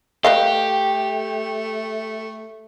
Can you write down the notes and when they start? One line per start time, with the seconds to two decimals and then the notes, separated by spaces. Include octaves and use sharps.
0.24 A3 G4 B4 D#5 F5